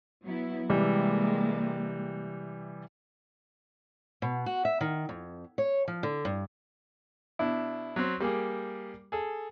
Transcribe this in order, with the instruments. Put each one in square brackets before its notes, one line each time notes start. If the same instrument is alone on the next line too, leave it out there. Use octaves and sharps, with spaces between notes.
[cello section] F#3 B3 E4
[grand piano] C3 E3 G3 [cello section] G#3 A#3
[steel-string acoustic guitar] B2
F#4
E5
D#3
F2
C#5
F3
D3
G2
[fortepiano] B2 D4 E4
F#3 C4
G3 A#3 G4 G#4
G#4 A4